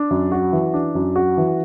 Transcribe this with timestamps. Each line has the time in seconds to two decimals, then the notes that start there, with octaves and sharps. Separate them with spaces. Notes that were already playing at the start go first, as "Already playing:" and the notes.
Already playing: D4
0.10 F#2
0.32 F#4
0.52 E3
0.74 D4
0.95 F#2
1.16 F#4
1.37 E3